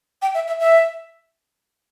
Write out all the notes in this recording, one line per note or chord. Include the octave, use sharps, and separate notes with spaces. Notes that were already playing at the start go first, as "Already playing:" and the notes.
G5
E5
E5
E5